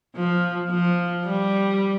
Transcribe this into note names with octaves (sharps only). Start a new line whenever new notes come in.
F3
F3
G3